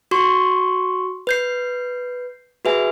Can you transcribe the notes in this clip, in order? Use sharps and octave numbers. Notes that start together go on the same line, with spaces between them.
F#4 C6 C#6
B4 G6 C7
F#4 G#4 B4 E5 G#5